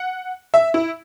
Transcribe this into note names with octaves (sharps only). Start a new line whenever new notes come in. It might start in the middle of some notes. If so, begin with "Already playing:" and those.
Already playing: F#5
E5
E4